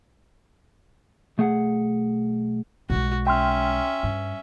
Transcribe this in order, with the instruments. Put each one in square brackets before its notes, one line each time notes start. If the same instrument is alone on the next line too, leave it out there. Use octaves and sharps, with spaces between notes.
[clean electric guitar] B1 A3 G#4 F#5
[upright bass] B1 G#3 [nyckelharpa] F#4
[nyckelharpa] C#4 E5 [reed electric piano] G5 C6 F6
[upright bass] G2